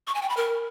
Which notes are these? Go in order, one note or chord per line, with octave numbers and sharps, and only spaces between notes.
C#6
G#5
G5
B5
A#4